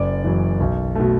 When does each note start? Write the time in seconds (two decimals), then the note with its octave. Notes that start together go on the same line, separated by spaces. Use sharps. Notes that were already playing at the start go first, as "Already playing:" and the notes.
Already playing: F#1 D5
0.24 F#2 E3
0.60 B1
0.95 B2 A3